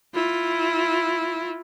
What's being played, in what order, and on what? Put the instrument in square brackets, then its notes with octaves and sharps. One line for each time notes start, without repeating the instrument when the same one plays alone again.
[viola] E4 F4